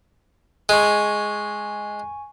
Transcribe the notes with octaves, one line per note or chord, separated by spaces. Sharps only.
G#3 G#5 C#6